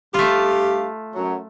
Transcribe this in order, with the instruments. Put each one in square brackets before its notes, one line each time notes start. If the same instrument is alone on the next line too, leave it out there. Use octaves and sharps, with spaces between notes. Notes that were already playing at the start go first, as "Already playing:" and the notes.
[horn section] G2 G4 F5 [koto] A3 F4
[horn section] F#2 F#3